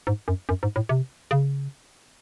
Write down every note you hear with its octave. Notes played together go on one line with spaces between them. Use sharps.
G#2
F#2
F#2
G#2
A2
C3
C#3